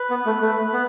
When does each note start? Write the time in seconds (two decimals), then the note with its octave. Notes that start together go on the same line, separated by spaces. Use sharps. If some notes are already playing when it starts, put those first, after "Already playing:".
Already playing: B4
0.10 B3
0.26 A3
0.41 A3
0.73 B3